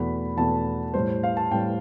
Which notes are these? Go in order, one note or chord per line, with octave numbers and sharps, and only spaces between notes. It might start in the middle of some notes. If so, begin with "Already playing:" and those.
Already playing: E2 B2 A3 B5
E2 B2 A3 A5
A2 G3 C5
F5
A5
A2 G3 G5